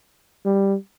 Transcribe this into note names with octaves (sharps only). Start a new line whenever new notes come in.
G3